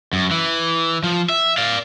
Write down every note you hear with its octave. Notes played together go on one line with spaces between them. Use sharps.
F#2
E3
F3
E5
D5 F5